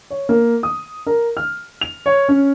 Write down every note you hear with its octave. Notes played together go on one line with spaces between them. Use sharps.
C#5
A#3
D#6
A#4
F6
F7
C#5
C#4